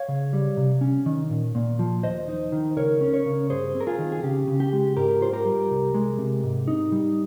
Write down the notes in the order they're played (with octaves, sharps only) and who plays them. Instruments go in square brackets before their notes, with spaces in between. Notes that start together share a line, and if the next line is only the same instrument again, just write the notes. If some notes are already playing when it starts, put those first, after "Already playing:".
Already playing: [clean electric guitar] C#5 F5
C#3
G3
C3
C#4
D#3
A#2
A#2
F3
D#2 C5 D#5
D#4
D#3
C#2 A#4 C#5
C#4
A#4 C#5
C#3
G2 G#4 C5
C4
A#4
F4 G#4
D#3
G#4
C#3 G4
C#3
G4
G#3
G#2 G4 A#4
F4 C5
G4 A#4
G3
C2
G#3
C3
G#2
D#4
G3